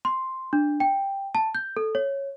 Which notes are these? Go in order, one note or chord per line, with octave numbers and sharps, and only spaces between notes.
C6
D4
G5
A5
G6
A4
C#5